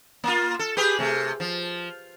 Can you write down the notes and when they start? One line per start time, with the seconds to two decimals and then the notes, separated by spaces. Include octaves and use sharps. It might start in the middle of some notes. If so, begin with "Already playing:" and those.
0.24 A#3 F4
0.59 A4
0.77 G4 G#4 B4
0.99 C3 A3
1.40 F3